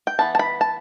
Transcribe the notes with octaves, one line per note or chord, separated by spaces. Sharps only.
G5
E3 B3 A5
A5
B5
A5